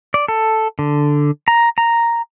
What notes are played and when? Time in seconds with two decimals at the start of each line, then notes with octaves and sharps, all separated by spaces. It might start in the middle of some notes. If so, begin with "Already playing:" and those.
0.14 D5
0.28 A4
0.79 D3
1.48 A#5
1.78 A#5